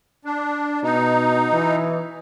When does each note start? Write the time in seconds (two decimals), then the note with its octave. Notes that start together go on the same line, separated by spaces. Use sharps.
0.25 D4
0.83 B2 D#4
1.53 E3